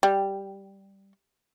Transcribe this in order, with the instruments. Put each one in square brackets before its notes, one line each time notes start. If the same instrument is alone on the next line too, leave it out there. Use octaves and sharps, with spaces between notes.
[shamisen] G3